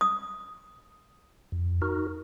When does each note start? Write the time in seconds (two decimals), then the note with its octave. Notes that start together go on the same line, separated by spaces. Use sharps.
0.01 D#6
1.52 F2
1.82 D#4 F#4 A#4